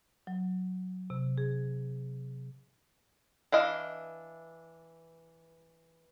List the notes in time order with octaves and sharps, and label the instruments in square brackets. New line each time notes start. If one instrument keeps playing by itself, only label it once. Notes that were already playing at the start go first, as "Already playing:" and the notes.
[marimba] F#3
C3
G#4
[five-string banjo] E3 D4 D#5 F5